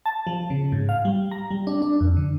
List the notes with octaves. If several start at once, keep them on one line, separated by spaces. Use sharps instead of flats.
A5
F3
C#3
G#2
F5
G3
A#5
G3
D4
D4
F2
D3